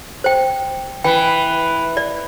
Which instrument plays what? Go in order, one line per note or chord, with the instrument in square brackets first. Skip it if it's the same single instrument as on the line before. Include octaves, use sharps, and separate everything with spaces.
[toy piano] C5 G5
[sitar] E3 [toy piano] G5
[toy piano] D5